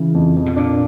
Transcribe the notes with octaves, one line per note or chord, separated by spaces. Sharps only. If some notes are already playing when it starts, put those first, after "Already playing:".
Already playing: C#3 E3
F2
F2
B2
A#2 D4